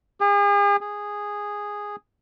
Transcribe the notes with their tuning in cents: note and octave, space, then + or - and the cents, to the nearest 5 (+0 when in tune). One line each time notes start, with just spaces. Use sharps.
G#4 -40
G#4 -10